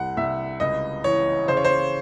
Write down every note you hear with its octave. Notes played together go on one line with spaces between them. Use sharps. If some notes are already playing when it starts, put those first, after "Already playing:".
Already playing: C2 F#5
C2 E5
C#2 D#5
E3 C#5
C#3 C5
C#5
C5